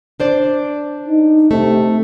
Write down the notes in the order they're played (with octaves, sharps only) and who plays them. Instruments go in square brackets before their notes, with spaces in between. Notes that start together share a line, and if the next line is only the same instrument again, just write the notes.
[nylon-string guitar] D4 C5 D5
[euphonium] D#4
[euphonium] C3 [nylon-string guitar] A3